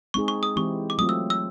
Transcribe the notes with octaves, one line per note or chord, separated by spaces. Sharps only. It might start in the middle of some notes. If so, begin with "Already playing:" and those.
G#3 C4 D#4 G#4 C#6
C#6
D#6
E3 G#3 C4 E4 G4 C#6
D6
F#3 A3 C4 F4 D#6
E6
E6